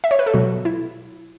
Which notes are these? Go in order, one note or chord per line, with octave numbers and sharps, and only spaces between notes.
E5
C#5
B4
A4
B2 F#3 F#4
E4